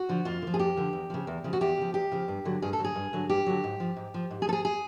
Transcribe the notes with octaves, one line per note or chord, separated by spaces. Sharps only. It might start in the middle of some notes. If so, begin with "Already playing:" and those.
Already playing: F#4
D3 F3
F2 F4
D3
F3
G#4
F2 G4
D3 F3
E2
C#3 F3
E2
C#3 F3
F#4
E2 G4
C#3 F3
E2 G4
C#3 F3
G2
D3 F#3
G2 G#4
A4
D3 F#3
G#4
G2
D3 F#3
G2 G4
D3 F#3
G#2
F3
G#2
F3
G#2
G#4
F3 A4
G#4
G#4